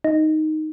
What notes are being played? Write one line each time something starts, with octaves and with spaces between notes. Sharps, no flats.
D#4